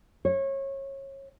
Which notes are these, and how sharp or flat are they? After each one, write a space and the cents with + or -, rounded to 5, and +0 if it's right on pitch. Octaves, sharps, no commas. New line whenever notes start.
C#5 -25